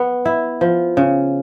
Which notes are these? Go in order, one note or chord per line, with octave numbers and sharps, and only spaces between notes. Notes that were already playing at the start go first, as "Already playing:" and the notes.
Already playing: B3
E4
F3
C#3